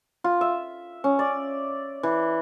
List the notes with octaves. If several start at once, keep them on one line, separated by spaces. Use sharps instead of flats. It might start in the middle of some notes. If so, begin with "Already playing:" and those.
F4
E5
C#4
D5
E3